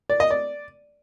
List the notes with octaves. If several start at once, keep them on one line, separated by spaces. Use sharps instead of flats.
D5
D#5
D5